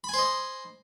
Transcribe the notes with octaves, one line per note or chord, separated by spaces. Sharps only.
C5 D#5 G#5 B5